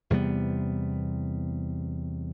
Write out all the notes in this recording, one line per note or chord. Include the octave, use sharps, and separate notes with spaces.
E2 C3 G3 B3